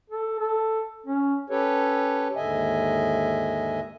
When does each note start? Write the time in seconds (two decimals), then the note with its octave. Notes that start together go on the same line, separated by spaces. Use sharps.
0.10 A4
0.39 A4
1.06 C#4
1.50 C#4 G4 A4 B4 C#5
2.36 D#2 G#2 D3 D#5 E5 G#5